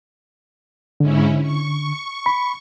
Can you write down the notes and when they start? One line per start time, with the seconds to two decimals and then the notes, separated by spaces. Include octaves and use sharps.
1.00 G#2 D3 C#4 E4
1.42 C#6
2.26 B5